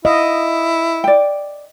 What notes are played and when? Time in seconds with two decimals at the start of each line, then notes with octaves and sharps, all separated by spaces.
0.05 E4 D#5 F5
1.04 D5 G5